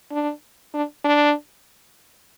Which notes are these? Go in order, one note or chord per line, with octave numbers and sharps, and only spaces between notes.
D4
D4
D4